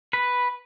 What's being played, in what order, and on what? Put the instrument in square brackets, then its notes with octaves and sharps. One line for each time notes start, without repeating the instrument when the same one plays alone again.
[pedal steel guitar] B4